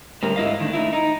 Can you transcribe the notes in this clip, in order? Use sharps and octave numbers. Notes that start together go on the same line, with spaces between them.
A2 D3 G3 A#4
G#2 E4 D#5 F5
D#3 A3 D4
A3 D#4 E4
D#4